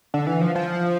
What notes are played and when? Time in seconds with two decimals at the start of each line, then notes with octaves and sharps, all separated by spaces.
0.14 D3
0.27 E3
0.41 F3
0.55 F3